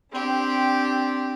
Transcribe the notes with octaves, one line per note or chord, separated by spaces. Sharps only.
C4 D4 G4